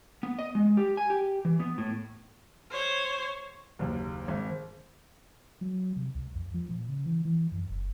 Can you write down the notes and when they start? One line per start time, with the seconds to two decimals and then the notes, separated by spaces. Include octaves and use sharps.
0.23 B3
0.39 D#5
0.55 G#3
0.77 G4
0.97 G#5
1.10 G4
1.45 E3
1.60 B3
1.78 A2
2.71 C5 C#5
3.79 F#1 D#2
4.28 G#1
5.61 F#3
5.96 C3
6.15 C#2
6.36 F2
6.54 F3
6.70 A#2
6.88 C#3
7.05 E3
7.25 E3
7.52 F#2
7.70 F#1